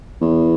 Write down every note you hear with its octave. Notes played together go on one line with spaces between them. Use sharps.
E2